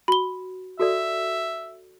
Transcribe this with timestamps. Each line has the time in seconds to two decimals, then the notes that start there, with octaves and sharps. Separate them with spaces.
0.08 F#4 B5 G7
0.80 F#4 A4 D5 E5